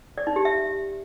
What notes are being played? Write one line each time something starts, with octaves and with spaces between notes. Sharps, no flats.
D5
D#4
G4
E5